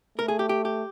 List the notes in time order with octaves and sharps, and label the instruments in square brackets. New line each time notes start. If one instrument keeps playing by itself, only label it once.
[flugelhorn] A3 [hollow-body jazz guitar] A#4
[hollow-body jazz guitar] G#4
G4
G4
G4